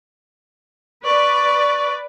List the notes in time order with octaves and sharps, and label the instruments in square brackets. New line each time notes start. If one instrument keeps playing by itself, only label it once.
[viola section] B4 D5 [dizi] C#6